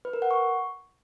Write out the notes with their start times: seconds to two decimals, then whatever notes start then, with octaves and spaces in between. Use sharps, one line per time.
0.05 B4
0.13 A#4
0.22 F#5
0.31 C#6